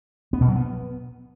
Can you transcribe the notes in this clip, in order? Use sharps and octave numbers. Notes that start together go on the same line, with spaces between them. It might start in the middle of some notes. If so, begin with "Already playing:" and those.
B3
B2
F#3
B3